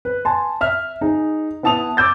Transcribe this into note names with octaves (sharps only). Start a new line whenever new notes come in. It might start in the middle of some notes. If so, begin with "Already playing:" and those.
B4
G#5 A5 C6
E5 F6
D#4 G#4
B3 E4 A5 D#6 F7
D6 E6 G6 A6